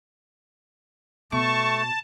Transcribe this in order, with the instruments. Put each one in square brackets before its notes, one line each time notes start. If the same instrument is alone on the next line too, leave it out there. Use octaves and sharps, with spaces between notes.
[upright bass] B2 [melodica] A3 [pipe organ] A5 [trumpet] C#6